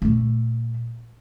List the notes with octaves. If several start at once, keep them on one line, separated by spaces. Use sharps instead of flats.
A#2 A3